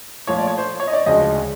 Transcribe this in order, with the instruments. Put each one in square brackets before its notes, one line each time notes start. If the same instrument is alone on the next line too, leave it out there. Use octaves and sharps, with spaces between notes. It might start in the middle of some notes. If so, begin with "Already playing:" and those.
[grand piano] A#2 F3 A3 C#5
D5
C#5
C5
C#5
D#5
D5
D2 C#3 F3 G#3 D#5